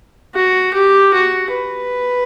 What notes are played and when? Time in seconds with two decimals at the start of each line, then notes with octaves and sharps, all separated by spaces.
0.35 F#4
0.74 G4
1.14 F#4
1.52 B4